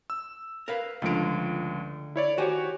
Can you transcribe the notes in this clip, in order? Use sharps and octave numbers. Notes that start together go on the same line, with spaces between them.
E6
A#4 B4 F5
C#2 D3 F3 A3 D7
E4 C#5 D5
D#3 F#4 G4 C5 C#5 G#5